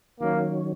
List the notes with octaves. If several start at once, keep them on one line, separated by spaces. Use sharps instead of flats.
D#3 F#3 A#3 C#4